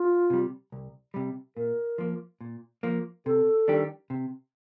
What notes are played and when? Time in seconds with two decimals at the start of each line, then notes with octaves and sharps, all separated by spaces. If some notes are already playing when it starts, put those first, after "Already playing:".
Already playing: F4
0.30 C3 G3
0.72 C2
1.14 C3 G3
1.57 A#2 A#4
1.98 F3 A#3
2.41 A#2
2.83 F3 A#3
3.26 C3 A4
3.68 D#3 G3 D4 G4
4.10 C3